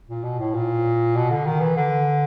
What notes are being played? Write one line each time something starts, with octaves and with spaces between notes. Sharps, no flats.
A#2
B2
A2
A#2
B2
D3
D#3
E3
D3